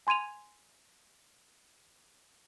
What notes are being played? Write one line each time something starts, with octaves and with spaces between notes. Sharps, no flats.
G#5 C6 G#6 D#7 F7